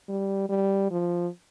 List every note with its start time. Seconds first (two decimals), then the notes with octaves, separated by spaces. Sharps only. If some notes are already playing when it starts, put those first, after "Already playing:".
0.08 G3
0.49 G3
0.91 F3